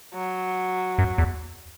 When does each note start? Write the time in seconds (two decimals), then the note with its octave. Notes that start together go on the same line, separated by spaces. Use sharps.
0.14 F#3
0.98 F#2
1.18 E2